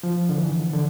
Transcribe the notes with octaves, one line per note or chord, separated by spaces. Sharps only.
F3
D3
E3
D3